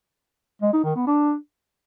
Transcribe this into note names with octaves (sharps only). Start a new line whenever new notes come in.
G#3
D#4
D#3
B3
D4